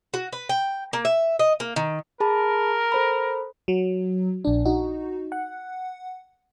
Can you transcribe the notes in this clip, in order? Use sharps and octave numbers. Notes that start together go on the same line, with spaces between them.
F#4
B4
G5
A#3
E5
D#5
A#3
D#3
G#4 A#4 A5 B5
A4 C5 B5
F#3
A#1 D4
D#4 F#4
F#5